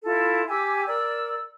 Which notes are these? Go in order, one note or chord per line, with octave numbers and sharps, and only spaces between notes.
E4 F4 A4
G4 G#5 D6 E6
A#4 D5 E6